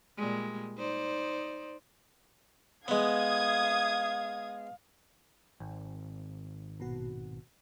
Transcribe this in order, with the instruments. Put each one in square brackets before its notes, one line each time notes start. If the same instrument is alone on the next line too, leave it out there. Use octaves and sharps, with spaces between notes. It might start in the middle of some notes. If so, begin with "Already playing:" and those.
[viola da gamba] A#2 G3 G#3
D#4 C5 D5
[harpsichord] G#3 B3 [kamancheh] F5 [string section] D#6 G#6
[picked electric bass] G#1
[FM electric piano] A#1 B2 F#4